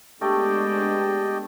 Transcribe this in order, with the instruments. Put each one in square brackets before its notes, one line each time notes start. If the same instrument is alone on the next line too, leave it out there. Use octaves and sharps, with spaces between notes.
[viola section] G#3 B3 D4 [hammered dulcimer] A3 [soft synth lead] G4 [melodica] D5 D#5 G5